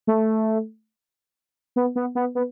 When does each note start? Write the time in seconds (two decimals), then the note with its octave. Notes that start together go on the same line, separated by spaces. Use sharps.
0.07 A3
1.76 B3
1.96 B3
2.15 B3
2.35 B3